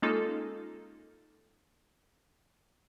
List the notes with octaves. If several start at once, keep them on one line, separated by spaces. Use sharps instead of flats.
G#3 A#3 C#4 D#4 F4 A4